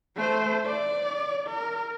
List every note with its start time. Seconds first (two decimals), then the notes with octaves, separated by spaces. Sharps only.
0.16 A3 C5
0.66 D5
1.48 A#4